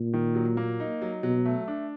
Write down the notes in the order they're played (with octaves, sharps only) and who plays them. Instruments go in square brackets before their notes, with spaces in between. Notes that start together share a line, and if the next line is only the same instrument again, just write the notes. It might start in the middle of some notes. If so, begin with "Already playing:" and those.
Already playing: [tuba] A#2
[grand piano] D#3
F#3
A#3
D#4
F#3
[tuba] B2 [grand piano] F#3
[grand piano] A3
D4